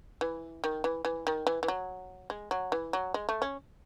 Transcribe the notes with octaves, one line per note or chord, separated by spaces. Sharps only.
E3
D#3
E3
E3
D#3
E3
E3
F#3
G#3
F#3
E3
F#3
G#3
A3
C#4